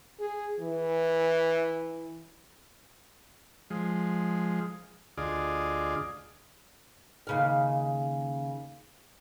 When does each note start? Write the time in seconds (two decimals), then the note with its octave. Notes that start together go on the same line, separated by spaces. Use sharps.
0.20 G#4
0.60 E3
3.70 F3 G#3
5.18 D2 F4 G#4 D5 D#5
7.27 D#2 C#3 F5